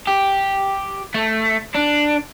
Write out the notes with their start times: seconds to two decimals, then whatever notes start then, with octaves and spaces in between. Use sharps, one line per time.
0.07 G4
1.14 A3
1.74 D4